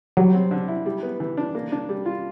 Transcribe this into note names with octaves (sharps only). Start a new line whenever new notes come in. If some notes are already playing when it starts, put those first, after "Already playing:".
F#3 G3
C4
D3
E4
G3
B3
E3
D4
A#3
D4
G3
F4